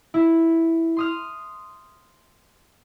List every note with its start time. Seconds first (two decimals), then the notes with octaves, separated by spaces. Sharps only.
0.14 E4
0.97 C6 D#6 F6